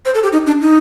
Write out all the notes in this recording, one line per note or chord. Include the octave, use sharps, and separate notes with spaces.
C5
A4
G4
D#4
D4
D#4